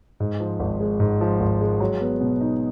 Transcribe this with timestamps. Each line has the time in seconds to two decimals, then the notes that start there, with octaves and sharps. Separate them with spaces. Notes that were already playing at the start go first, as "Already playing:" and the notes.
0.20 G#2
0.40 F3
0.59 G#1
0.80 G#3
1.00 G#2
1.21 F3
1.40 G#1
1.61 G#3
1.80 F#3
2.01 B3
2.21 B2
2.41 D#4